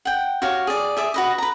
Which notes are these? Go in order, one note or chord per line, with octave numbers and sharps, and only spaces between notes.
F#5 G5
F#4 G4 C#5 F5
G#4 D5
G#4 E5 D6
F#4 B4 D#5
B4 A#5